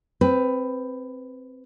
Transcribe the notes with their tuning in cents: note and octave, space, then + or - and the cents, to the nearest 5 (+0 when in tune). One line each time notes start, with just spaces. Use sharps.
C4 +0 B4 +15